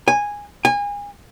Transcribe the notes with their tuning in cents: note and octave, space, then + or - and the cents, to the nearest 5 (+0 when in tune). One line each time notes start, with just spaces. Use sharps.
G#5 -10
G#5 -30